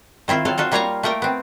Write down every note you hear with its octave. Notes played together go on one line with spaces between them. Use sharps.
D#3 C4 E4 F4
F#3 F4 A4 F5
D#4 F4 F#4 A4
G3 A#3 F4 C#5 F5 A#5
A3 A#3 A#4 G5
B3 C4